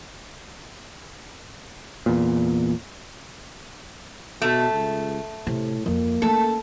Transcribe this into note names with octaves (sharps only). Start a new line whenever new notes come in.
E2 A#2
B2 A3
C#2
A2 C3
F2 A#3
A3 C#4 A4